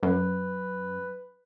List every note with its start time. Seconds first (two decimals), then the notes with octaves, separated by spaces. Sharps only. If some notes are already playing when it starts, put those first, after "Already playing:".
0.03 F#2 B4